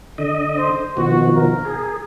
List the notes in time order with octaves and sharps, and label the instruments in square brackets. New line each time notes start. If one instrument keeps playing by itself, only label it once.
[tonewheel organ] D3 D#5
[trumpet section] C5
[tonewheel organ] B2 D#3 F3 [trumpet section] F#4
[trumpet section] A#4
[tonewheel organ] G#4